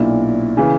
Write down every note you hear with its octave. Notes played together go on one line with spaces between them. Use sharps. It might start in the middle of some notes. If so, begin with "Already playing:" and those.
Already playing: B1 A#2 D4 E4
C#3 E3